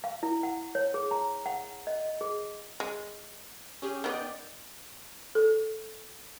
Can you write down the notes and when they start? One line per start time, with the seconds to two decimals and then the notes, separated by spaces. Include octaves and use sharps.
0.04 F5
0.23 E4
0.43 F#5
0.75 C#5
0.94 G#4
1.11 A#5
1.46 F#5
1.87 D#5
2.21 G#4
2.80 G#3
3.82 C#4 G4 G#4
4.04 D#3 B3 D5 D#5 G5
5.35 A4